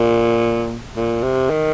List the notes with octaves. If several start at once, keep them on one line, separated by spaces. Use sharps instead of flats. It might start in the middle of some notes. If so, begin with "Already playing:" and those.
Already playing: A#2
A#2
C3
D#3